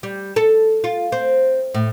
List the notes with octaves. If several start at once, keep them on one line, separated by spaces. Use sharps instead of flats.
G3
A4
F4
C4
A2